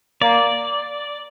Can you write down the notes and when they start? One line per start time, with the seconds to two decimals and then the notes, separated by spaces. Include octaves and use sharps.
0.22 A#3 D5